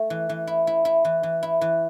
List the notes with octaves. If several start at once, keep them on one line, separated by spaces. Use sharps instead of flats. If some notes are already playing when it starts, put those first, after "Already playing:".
Already playing: A3
E3
E3
E4
E4
E4
E3
E3
E4
E3